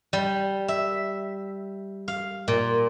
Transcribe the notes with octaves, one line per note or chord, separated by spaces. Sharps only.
G3
E5
F5
A#2